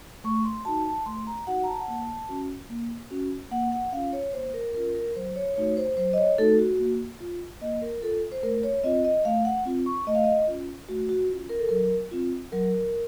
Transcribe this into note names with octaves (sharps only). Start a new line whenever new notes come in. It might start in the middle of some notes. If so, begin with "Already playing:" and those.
A3 C#6
C6
D#4 F#4 A5
A5
A3 C6
A#5
D#4 F#4 F#5
A#5
A5
F#5
A#3 A5
C#4 F#4
A#3
C#4 F#4
A#3 F#5
F#5
C#4 F4 F5
C#5
A#3 C5
A#4
C#4 F4 A#4
A#4
F#3 C5
C#5
A3 D#4 F#4 C#5
C5
F#3 C5
D#5
C#5
A3 D#4 F#4 A4
F#4
A#3
F4
A#3 D#5
A#4
F4 A4
C5
A3 A#4
C#5
C4 F4 D#5
D#5
A3 F5
F#5
C4 F4
C#6
A3 D#5
F5
D#5
C#4 F4
A3 F#4
F#4
C#4 F4
A#4
A4
F#3 A#4
C4 F4
F#3 A#4